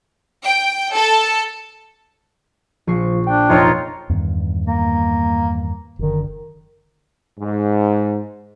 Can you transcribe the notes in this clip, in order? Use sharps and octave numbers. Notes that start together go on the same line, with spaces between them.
G5
A4
A#1 F3 C#6 C7
D4 G5
F1 D#4 F4 C#5 D6 C7
E2 G2 D#3
A#3
F#1 D3 D#3
G#2